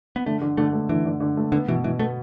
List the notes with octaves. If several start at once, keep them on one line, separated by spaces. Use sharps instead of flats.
B3
D3 A3
D3
D3 A3
A3
D3 E3
D3
D3
A3
D3 B3
B2 E3
B2 E3
A3 B3